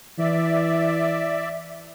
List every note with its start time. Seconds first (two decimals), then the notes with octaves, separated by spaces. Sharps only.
0.19 E3 D5 E5